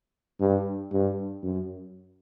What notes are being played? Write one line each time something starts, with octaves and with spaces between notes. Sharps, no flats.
G2
G2
F#2